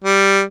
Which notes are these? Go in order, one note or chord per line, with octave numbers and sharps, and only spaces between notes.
G3